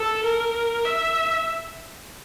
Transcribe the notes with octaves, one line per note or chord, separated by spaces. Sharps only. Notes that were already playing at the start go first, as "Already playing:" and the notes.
Already playing: A4
A#4
E5